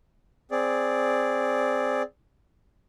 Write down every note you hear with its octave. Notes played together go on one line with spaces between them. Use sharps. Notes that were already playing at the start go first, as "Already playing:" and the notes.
C4 G#4 D5